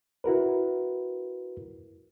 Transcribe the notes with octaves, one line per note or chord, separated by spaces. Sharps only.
E4 F#4 A#4 B4